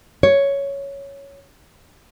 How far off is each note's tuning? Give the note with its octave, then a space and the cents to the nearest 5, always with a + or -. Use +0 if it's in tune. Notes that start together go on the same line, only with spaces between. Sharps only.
C#5 +5